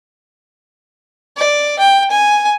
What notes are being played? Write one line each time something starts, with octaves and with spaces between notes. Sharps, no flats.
D5
G5
G#5